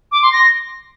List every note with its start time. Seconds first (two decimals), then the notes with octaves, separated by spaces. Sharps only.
0.12 D6
0.22 C6
0.32 A#6